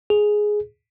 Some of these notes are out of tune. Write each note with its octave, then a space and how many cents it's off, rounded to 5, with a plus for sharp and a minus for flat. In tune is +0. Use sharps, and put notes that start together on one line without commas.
G#4 +5